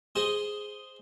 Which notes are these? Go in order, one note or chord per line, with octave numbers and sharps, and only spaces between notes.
G#4 C5 D#5